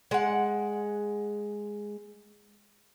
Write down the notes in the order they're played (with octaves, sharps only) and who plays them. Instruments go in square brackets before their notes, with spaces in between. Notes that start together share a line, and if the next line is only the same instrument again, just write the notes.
[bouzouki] G#3 F#5